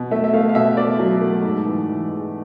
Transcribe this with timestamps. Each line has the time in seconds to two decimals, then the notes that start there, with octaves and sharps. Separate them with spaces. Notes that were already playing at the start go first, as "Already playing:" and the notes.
Already playing: B2
0.11 A3 E5
0.24 E5
0.33 A3 F5
0.49 F5
0.55 B2 E5
0.77 A3 D5
0.99 F#3
1.21 A3
1.43 G#2
1.66 E3
1.88 E3
2.09 G#3